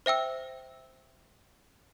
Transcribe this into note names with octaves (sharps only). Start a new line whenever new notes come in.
C5 E5 G5 E6